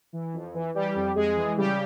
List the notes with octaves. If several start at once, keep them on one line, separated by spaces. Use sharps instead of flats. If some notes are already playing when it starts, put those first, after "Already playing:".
E3
F2
E3
E3 G3 G4
F2
F2 G#3 G#4
E3
C#3 G3 G4